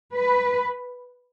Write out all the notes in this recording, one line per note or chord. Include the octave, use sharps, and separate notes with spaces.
B4